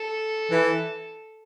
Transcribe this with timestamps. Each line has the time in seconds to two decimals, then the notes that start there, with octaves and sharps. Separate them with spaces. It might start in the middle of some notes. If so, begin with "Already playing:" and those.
Already playing: A4
0.49 E3